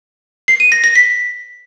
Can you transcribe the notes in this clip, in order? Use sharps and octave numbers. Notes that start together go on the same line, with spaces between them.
C7
D#7
A#6
A#6
B6